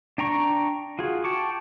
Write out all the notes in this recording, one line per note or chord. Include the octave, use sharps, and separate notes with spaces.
D4 G5 A#5 C#6
F4 F#4 G#4
G5 A5 C#6 D6